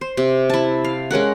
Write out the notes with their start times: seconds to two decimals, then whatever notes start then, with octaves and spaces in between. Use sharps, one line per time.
0.01 C5
0.17 C3
0.50 E4 A5
0.84 F5
1.11 G#3 C#4 A#4 F#5